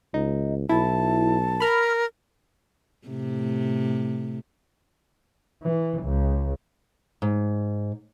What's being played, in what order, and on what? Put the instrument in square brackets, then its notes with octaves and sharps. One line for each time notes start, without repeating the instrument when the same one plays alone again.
[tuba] C#2 [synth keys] D#4
[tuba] B1 [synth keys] E4 [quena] A5
[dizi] A#4 [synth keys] B5 F6
[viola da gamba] A2 C3
[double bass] E3
C#2
[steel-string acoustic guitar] G#2